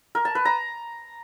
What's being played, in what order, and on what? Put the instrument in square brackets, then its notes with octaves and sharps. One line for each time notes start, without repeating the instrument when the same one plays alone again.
[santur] A#4
A5
B4
A#5